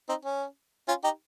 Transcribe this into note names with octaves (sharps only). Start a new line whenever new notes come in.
C4 D#4
C#4
C#4 F4
D#4 G4